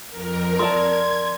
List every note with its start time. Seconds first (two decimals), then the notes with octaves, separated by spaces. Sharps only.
0.10 F2 A#4
0.59 A#4 D5 A5 C6 G#6